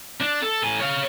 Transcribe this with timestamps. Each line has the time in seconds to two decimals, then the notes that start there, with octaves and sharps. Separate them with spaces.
0.20 D4
0.42 A4
0.63 A2 G#5
0.80 C#5 F5